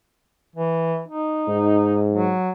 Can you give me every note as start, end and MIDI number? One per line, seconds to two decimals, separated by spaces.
0.55 1.01 52
1.08 2.03 63
1.48 2.33 44
2.13 2.51 54